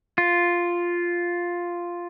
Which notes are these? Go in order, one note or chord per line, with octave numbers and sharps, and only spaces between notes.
F4